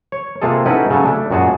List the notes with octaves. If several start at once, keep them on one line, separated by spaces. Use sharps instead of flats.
C#5
C3 A#3 F4 G#4 A4
C#4 D#4 E4 F#4 A4 B4
C#3 F#3 A4 G#5
A3 D4
F#2 A#2 F#4 G#4 A5